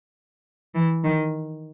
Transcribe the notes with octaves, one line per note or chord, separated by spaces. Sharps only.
E3
D#3